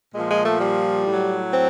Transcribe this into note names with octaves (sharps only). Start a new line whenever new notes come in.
A#2 F3 G#3
G#3
A3
G3
A2
F#3
C4